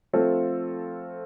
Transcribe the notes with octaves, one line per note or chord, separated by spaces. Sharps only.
F3 A3 C4 F4 A4